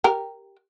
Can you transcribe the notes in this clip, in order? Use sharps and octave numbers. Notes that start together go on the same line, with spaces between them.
G4 A#4